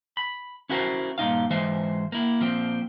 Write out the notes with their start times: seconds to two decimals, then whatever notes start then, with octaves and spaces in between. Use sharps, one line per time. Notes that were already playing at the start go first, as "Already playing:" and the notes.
0.17 B5
0.69 C#4 E4 F#4 A#4 C5
1.18 G2 A#2 D#4 F5
1.50 G#2 E3 G#3 C5 E5
2.12 A#3 E4
2.40 A#2 F3 C4